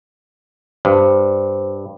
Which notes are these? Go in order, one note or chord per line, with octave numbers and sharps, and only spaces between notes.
G2 C5